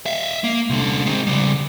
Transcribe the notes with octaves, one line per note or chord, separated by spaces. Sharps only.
E5 F5
A#3
C2 D3
G#3 C4
C#3 G3